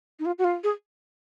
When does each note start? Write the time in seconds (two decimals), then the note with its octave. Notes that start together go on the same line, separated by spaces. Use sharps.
0.19 D#4
0.25 F4
0.38 F#4
0.44 F4
0.63 G#4